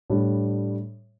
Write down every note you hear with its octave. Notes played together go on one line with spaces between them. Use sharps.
A2 G3 D4